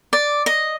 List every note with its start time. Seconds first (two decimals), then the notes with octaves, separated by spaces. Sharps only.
0.13 D5
0.46 D#5